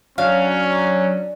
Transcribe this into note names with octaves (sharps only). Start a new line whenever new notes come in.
F#3 C#4 D4 F5